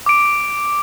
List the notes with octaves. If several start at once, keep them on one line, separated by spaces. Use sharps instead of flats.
D6 D7